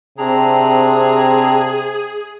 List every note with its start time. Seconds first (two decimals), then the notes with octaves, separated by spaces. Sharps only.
0.18 C3 C4 D4 G#4 A#5